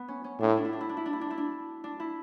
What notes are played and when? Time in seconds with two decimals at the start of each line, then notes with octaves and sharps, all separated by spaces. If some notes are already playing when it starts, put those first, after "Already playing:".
Already playing: B3
0.08 C#4
0.24 C#4
0.40 A2 D4
0.48 E4
0.57 D4
0.65 E4
0.73 D4
0.81 E4
0.89 D4
0.97 E4
1.06 D4
1.13 E4
1.21 D4
1.30 E4
1.37 D4
1.84 D4
2.00 E4